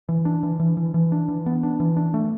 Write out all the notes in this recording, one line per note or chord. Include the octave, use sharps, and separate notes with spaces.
E3
D4
E3
E3
E3
E3
D4
E3
B3
D4
E3
D4
A3